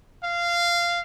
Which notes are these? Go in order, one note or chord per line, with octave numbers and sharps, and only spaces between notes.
F5